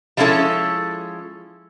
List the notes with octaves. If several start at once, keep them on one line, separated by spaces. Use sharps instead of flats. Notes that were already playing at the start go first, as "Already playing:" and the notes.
F3 G3 G#3 C#4 E4 A4